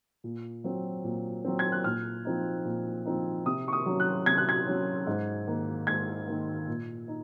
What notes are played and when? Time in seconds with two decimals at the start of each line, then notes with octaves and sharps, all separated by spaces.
0.24 A#2
0.64 F#3 C4
1.04 A#2
1.45 F#3 C4
1.59 G#6
1.72 F#6
1.84 A#2 F6
2.25 F3 C4 D#4
2.65 A#2
3.05 F3 C4 D#4
3.46 C3 D#6
3.68 C#6
3.73 D#6
3.86 F#3 C#4
4.00 F#6
4.26 C3 G#6
4.38 F#6
4.49 G#6
4.66 F#3 C#4
5.07 G#2
5.47 D#3 A#3
5.87 G#2 G#6
6.27 D#3 A#3
6.68 A#2
7.08 D#4